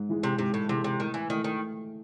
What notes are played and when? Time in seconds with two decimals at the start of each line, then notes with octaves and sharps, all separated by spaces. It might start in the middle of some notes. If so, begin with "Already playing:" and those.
Already playing: G#2
0.09 E3 G#3
0.23 C3
0.39 G#2 C3
0.54 A2
0.69 C3 E3 G#3
0.84 C3
1.00 A2 D#3
1.14 E3
1.30 D#3 E3 A3
1.44 D#3